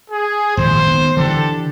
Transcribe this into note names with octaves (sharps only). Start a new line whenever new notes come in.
G#4
G#1 A#2 F3 C5
D#3 B3
D3 E3 D4 G4 A4